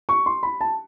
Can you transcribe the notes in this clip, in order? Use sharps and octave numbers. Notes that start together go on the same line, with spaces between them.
C#6
C6
B5
A5